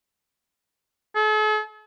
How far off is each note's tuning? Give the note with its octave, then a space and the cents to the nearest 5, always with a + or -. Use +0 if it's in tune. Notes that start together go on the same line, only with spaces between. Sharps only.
A4 -45